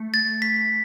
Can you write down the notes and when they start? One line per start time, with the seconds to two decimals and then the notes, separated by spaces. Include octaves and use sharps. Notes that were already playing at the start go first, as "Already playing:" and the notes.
Already playing: A3
0.14 A6
0.42 B6